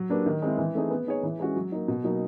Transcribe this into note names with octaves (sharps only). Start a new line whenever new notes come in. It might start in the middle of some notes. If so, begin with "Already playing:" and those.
Already playing: F#3
A#3 D4 G4 B4
D#3
G#3 C4 E4
E3
A3 C4 D#4 G#4
B3
D#4 G#4 C#5
E3
G#3 C#4 F#4
F#3
A#3 D#4
B2
F#3 A#3 D#4